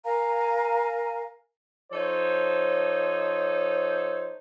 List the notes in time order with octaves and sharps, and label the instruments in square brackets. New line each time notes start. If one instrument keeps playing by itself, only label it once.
[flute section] A#4 F5 G#5 A#5
[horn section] F3 D#4 A4 C5 C#5